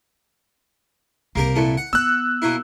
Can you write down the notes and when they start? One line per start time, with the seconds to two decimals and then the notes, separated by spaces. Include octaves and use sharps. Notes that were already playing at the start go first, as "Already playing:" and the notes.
1.35 C2 C3 A#3 G4 A#4
1.56 A#2 E3 A4
1.77 F#5
1.93 B3 E6 F#6
2.42 B2 A#3 E4